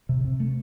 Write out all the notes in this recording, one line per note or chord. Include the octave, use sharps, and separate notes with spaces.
C3
C3
A3